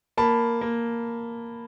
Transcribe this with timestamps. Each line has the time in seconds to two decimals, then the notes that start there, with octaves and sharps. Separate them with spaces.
0.17 A#3 A5 B5
0.61 A#3